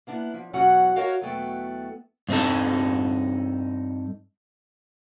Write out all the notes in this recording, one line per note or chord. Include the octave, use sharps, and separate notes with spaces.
A#3 B3 D4 E4
F3
E2 B2 F#3 C#4 F#4 F#5
F#4 A#4 C#5 D#5 F5 F#5
E2 B2 F#3 A3 B3 G5
G2 C4 D#4 A4